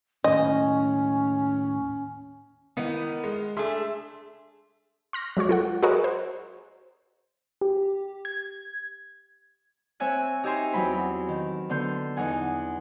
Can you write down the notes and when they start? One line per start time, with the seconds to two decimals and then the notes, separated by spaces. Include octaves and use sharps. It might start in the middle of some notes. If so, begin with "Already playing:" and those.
0.24 D#2 A2 C#4 D#5
2.77 D#3 E3 B3
3.24 G#3
3.57 A3 D4 G#4 E5 C6 E6
5.13 C6 F6 A#6
5.37 F#3 G#3 F#4 C#5
5.49 F4 A4 F#5
5.83 F#4 G#4 A#4 B4 C#5 D#5
6.04 C5
7.61 G4
8.25 G#6
10.00 C4 C#5 E5 G#5 F#6
10.43 D#4 G4 E5 G#5 A#5 C6
10.73 E2 F#3 C4 B5
11.28 D#3
11.69 D3 B3 C6 G6
12.17 E2 D#4 F#5 G#5